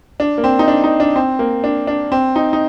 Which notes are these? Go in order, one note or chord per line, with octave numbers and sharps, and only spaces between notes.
D4
A#3
C4
D#4
D4
D#4
D4
C4
A#3
D4
D4
C4
D#4
D#4